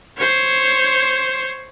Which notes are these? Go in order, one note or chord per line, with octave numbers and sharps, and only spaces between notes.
C5 C#5